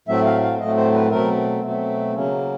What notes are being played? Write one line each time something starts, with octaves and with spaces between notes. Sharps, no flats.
A2 F#3 A3 C4 E5
F5
F5
A2 F#3 A3 C4 D#5
C5
B4
B2 F#3 A3 C4 A#4
B2 F#3 A3 C4
C#3 F#3 A#3 C#4